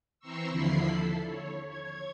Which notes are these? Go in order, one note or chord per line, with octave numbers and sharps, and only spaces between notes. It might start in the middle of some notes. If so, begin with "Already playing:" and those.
E3 C4 A#5 C6 C#6 E6
D#2 D3 F3 E4 B5 C7
A4
C#5
C#5 G#6